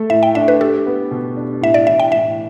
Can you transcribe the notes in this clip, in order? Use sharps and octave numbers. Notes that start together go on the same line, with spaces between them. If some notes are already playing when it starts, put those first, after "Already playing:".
Already playing: A3 A4
A2 E5
G5
D4 E5
B4
G4 A4
B3
B2
D4
A2 E5
D5
E3 E5
G5
A2 E5